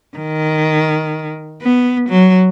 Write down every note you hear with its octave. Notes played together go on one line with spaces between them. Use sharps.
D#3
B3
F#3